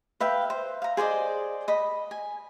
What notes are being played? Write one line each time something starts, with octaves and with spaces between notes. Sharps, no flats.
B4 E5 F5 G5
C5
F5 A#5
G#4 C5 D5 D#5
D#5 B5
G#5